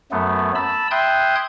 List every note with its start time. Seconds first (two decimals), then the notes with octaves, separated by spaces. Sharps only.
0.12 F#2 F#3 A3 B3
0.55 A5 B5 E6
0.91 E5 G5 C6 D#6 F#6 G#6